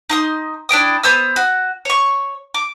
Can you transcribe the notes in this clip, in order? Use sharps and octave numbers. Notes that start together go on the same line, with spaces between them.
D#4 C6 D#6
D4 E4 G5 D#6
B3 C5 D#6 E6
F#4
C#5 C#6
D6